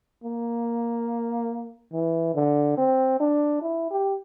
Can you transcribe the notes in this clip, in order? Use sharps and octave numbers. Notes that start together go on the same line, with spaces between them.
A#3
E3
D3
C4
D4
E4
G4